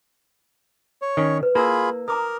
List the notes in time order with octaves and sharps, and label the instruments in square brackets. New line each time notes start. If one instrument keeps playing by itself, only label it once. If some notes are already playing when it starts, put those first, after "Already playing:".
[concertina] C#5
[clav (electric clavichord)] D#3 C#4
[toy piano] B4
[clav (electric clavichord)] A#3 [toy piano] E4 E6 [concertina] F4 G#4 B5
[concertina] A#4 [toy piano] A#5 D6 D#6